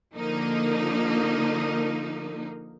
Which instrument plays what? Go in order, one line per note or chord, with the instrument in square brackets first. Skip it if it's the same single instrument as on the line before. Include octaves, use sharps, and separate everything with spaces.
[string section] D3 F3 A#3 D#4